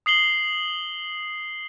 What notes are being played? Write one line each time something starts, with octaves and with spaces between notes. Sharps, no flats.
D#6 C7 F#7 G7